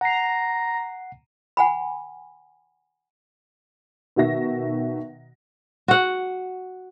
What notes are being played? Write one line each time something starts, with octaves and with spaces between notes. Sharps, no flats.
F#5 A#5 C7
F#5 G#5 B5
B2 D#3 F#4 E5 A#6
F#4 F#5